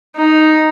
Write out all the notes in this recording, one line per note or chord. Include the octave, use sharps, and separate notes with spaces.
D#4